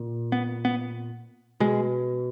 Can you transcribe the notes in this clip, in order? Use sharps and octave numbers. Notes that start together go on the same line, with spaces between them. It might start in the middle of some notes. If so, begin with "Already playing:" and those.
Already playing: A#2
B3
B3
B2 G#3